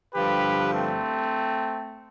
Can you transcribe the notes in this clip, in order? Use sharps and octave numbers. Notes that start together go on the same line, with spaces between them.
G2 D3 F3 G4 B4
A3 C4